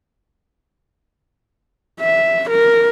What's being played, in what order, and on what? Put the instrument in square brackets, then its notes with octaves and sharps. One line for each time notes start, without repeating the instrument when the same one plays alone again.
[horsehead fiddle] E5
A#4